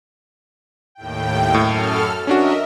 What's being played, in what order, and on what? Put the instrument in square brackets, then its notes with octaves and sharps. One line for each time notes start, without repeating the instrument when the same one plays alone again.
[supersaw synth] D#2 A2 G5
[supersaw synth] F#2 A4 F6 [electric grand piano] A2
[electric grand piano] C#4 D4 F#4 [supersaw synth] A#4 D#5 E5